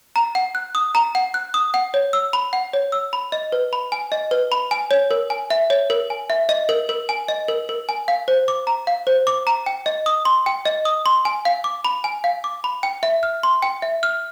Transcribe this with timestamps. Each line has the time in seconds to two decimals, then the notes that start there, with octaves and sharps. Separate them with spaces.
0.16 A#5
0.35 F#5
0.55 F#6
0.75 D#6
0.95 A#5
1.15 F#5
1.34 F#6
1.54 D#6
1.74 F#5
1.94 C#5
2.13 E6
2.33 B5
2.53 F#5
2.73 C#5
2.92 E6
3.13 B5
3.32 D#5
3.52 B4
3.73 B5
3.92 G#5
4.12 D#5
4.31 B4
4.52 B5
4.71 G#5
4.91 C#5
5.11 A#4
5.30 G#5
5.50 E5
5.70 C#5
5.90 A#4
6.10 G#5
6.30 E5
6.49 D#5
6.69 A#4
6.89 A#4
7.09 G#5
7.28 D#5
7.48 A#4
7.69 A#4
7.89 G#5
8.08 F5
8.28 C5
8.48 D6
8.67 A#5
8.87 F5
9.07 C5
9.27 D6
9.47 A#5
9.66 G5
9.86 D#5
10.06 D#6
10.25 C6
10.46 G5
10.65 D#5
10.85 D#6
11.06 C6
11.25 G#5
11.45 F5
11.64 D6
11.85 B5
12.04 G#5
12.24 F5
12.44 D6
12.64 B5
12.83 G5
13.03 E5
13.23 F6
13.43 C6
13.62 G5
13.82 E5
14.03 F6